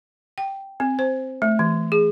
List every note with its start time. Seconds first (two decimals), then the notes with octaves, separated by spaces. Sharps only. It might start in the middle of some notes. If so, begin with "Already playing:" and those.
0.38 G5
0.80 C4
0.99 C5
1.42 A3
1.59 E3
1.92 G#4